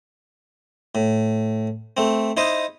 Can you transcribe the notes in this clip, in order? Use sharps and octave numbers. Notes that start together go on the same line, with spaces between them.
A2
A3 C4
D#4 E4 C5 D#5